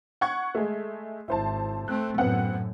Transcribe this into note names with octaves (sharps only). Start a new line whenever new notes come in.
F#5 C#6 G#6
G#3 A3
G#1 E4 C5 A5
A3 C4 F#6
F#2 A2 B3 C4 F#5